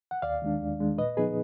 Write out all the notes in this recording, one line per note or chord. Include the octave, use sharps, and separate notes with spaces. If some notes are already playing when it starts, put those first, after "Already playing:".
F#5
D#2 D5 F5
D#3 G#3 D4
D#2
D#3 G#3 D4
A#2 B4 D#5
F3 B3 D#4 G#4 B4